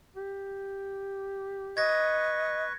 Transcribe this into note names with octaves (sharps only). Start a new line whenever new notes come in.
G4
B4 D#5 C#6 G#6 A#6